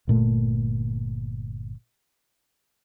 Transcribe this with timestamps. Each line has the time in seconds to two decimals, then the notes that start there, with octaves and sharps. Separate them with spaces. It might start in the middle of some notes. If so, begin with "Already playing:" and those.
0.08 G1 A#2 A3